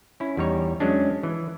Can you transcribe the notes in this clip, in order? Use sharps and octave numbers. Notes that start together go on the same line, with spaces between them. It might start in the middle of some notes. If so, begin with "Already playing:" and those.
C#4 E4
E2 G3 D#4 C#5
F#3 G#3 C#4 D4
E3